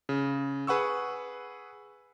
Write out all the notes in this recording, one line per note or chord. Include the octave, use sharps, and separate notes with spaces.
C#3
G#4 B4 F#5 C#6 E6